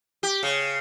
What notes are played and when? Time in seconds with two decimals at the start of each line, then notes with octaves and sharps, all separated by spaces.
0.23 G4
0.43 C#3